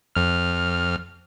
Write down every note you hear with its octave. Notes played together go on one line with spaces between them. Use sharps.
F2 F6